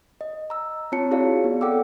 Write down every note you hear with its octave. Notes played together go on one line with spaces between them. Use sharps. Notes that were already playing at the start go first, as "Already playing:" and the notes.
D#5
A#5 E6
C4 F4 C#5 A5 C#7
E4 F#4 G#4 C#5 D5 F5
B3
A4 F#5 G5 D6 E6